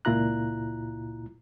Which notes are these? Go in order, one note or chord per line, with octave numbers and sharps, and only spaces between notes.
C#2 A#2 E4 F4 A#5 F#6